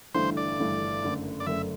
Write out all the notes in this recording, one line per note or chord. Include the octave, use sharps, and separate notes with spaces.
G1 G2 E3 A3 C5
D5
G1 G2 E3 A3
F#1 F#2 D3 A3
D5
F#1 F#2 D3 A3 E5